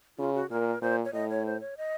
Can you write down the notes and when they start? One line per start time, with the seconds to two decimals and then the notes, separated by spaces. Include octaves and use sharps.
0.18 C#3 F4
0.34 F#4
0.50 A#2 A#4
0.82 A#2 C5
1.05 C#5
1.13 A2 D#5
1.29 C#5
1.46 C5
1.60 C#5
1.77 D#5